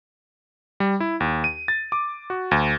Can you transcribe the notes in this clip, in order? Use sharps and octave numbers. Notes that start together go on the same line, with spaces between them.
G3
E4
D#2
D#7
A6
D6
F#4
D2